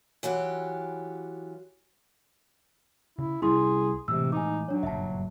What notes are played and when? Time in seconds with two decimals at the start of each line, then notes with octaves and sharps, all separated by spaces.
0.23 E3 F#3 F4 G4
3.18 C#3 E4
3.42 C2 G3 C#4 E4 G#4 C6
4.08 A2 C3 E3 G#3 E6
4.32 D#4 G#5 D6
4.68 F#3 D4 C#5
4.83 F#1 G2 A#2 E5 A5